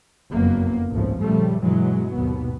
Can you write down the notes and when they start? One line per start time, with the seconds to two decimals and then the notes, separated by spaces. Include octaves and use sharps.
0.30 F#1 F2 F#3 A#3 B3
0.90 G#1 C#2 A2 F3
1.22 A#2 C#3 F3 G3 A3
1.60 G2 B2 E3 F#3 G#3
2.14 G#1 D#2 B2 B3